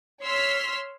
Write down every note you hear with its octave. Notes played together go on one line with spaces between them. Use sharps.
C#5 C6 E6 F6 B6